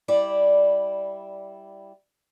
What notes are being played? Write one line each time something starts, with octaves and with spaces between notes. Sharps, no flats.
G3 E4 D5